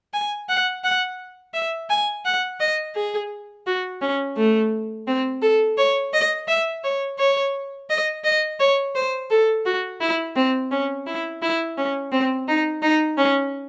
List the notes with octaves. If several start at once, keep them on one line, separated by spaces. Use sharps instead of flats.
G#5
F#5
F#5
E5
G#5
F#5
D#5
G#4
F#4
C#4
A3
C4
A4
C#5
D#5
E5
C#5
C#5
D#5
D#5
C#5
C5
A4
F#4
E4
C4
C#4
E4
E4
C#4
C4
D#4
D#4
C#4